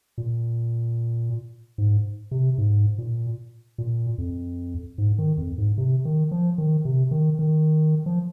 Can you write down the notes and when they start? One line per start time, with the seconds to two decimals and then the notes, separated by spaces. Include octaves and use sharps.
0.18 A#2
1.78 G#2
2.31 C3
2.58 G#2
2.98 A#2
3.78 A#2
4.18 F2
4.98 G#2
5.18 D#3
5.38 F2
5.58 G#2
5.78 C3
6.05 D#3
6.31 F3
6.58 D#3
6.85 C3
7.11 D#3
7.39 D#3
8.06 F3